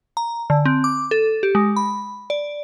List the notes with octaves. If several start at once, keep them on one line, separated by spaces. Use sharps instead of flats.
A#5
D3
C4
D6
A4
G4
G#3
B5
D5